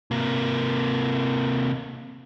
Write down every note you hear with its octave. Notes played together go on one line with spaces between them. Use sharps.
C3 A#3